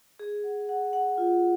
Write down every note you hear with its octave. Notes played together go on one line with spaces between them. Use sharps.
G#4
F#5
F#5
F#5
F4